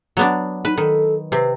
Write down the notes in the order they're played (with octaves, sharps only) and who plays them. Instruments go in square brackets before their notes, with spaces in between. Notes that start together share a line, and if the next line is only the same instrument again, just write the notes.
[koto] F#3 B3 D4
[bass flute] D#4 [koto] B4
[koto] D#3 [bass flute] A4
[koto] C3 C4 [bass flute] B4